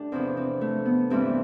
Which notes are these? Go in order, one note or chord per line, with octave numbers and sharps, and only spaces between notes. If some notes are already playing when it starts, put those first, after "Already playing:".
Already playing: A2 D4 G4 A4
E2 C3 F3 C4
C4
A3
B3
G2 E3 G3 C4